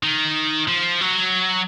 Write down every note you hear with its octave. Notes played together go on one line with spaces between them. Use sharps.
D#3
F3
F#3